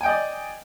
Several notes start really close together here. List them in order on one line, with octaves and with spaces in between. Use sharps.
G#5 G5 D#5 D5